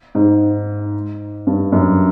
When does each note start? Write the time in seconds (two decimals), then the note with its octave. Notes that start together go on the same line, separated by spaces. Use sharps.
0.15 G#2
1.47 G2
1.72 F#2